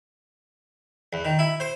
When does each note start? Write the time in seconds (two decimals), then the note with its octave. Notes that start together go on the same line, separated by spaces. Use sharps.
1.13 E2
1.25 D#3
1.39 E4
1.60 C5